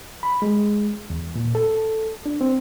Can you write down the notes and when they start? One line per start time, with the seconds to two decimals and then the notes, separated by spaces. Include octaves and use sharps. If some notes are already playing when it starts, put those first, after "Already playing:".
0.23 B5
0.42 G#3
1.10 E2
1.36 A#2
1.55 A4
2.26 D4
2.41 C4